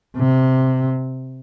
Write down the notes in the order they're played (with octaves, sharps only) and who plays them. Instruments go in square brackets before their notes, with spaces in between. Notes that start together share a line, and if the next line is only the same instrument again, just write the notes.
[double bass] C3